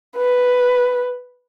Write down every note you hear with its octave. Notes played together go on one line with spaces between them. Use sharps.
B4